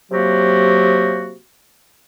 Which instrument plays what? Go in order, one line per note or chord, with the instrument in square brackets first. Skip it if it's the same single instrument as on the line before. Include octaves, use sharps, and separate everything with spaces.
[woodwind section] C3 F#3 A#3 F#4 G4